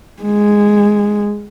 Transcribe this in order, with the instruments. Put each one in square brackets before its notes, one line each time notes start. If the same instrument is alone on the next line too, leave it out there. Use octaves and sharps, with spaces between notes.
[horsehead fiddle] G#3